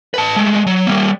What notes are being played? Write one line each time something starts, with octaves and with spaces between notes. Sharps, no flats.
B4 A5
G#3 A3
F#3
G3 A#3